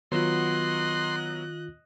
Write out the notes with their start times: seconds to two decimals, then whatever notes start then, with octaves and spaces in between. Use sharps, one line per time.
0.12 D#3 F#3 B3 F4 D#5 C6 F#6